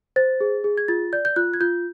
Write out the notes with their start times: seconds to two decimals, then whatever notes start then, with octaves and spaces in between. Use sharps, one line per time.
0.16 C5 A6
0.41 G#4
0.64 G#4
0.78 G#6
0.88 F4 A6
1.13 D5 G6
1.25 G6
1.36 F4 F#6
1.54 G#6
1.61 F4 G6